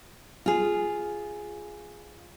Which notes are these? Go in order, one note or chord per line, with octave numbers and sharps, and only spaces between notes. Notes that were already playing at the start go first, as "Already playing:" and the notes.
F4 G#4